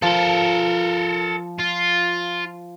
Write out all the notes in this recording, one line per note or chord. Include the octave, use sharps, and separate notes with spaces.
F3 A4 A#4
F4